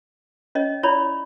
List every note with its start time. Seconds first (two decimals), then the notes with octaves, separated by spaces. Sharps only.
0.55 C#4 C#5 D#5
0.83 E4 C#5 D5 B5